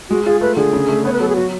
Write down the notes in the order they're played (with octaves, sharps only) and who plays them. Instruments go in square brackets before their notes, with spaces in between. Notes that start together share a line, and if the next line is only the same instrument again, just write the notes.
[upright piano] G#3 [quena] F#4
[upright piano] F4 [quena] G#4
[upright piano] A3 [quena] B4
[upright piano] D3 [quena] G#4
[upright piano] C#3
A3
[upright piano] B3 [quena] C#5
[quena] B4
[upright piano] F#3 [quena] A4
[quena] G#4
[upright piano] F#3 [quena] F#4